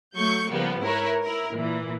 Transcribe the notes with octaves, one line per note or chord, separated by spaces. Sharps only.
F#3 A3 C#6 G6
C#3 F3 G3 A#3 B3
G#2 E4 A#4 B4 C#5
E4 A#4
A#2 E3